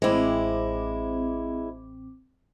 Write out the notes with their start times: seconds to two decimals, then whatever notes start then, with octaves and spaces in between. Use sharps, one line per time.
0.02 A1 G#3 C4 E4 D6